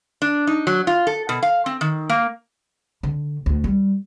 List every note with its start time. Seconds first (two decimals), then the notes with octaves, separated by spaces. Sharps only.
0.22 D4
0.47 D#4
0.67 F#3
0.87 F4
1.07 A4
1.29 B2
1.43 F5
1.66 C4
1.81 D#3
2.09 A#3
3.03 D3
3.46 D2
3.64 G3